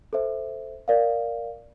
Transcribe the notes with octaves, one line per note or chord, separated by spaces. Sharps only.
A4 C5 E5
A#4 D5 F5